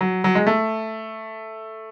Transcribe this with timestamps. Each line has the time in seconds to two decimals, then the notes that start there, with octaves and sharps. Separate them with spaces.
0.01 F#3
0.24 F#3
0.35 G#3
0.47 A3